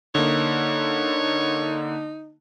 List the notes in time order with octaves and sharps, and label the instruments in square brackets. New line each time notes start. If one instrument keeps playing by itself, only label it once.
[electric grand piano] D3 A#3 [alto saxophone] D#4 [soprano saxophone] C#5